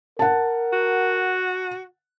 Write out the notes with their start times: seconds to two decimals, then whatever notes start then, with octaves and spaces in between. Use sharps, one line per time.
0.19 A#4 F#5 A5
0.73 F#4